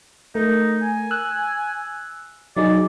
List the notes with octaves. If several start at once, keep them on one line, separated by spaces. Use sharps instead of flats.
A3 D#4 A#4
G#5
E6 F#6
F#3 D#4 G#4 D5